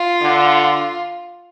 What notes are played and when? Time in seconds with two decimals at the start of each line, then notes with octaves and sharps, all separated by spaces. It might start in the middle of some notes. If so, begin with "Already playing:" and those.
Already playing: F4
0.22 D3